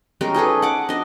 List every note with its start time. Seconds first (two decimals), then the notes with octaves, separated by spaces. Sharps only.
0.21 G3 G#3 C#4 A#4
0.34 D#4 G#4 A4 B4
0.62 F#5 D6
0.89 D4 D#5